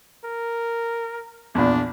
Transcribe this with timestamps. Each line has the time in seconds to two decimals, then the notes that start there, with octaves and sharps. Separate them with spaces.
0.25 A#4
1.55 A#1 E2 D4